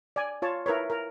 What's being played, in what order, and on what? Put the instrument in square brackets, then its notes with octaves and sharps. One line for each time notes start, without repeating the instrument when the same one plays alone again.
[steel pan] D5 G#5
F4 C#5 A5
E4 A#4 B4 C#5
A#4